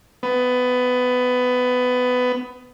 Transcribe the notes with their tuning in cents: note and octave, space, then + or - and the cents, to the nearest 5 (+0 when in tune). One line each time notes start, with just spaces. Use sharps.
B3 +20